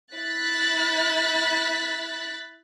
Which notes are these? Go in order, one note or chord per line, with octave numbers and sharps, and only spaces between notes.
E4 F#6 A6 B6